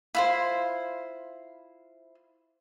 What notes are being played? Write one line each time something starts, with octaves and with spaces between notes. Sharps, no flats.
E4 F4 C5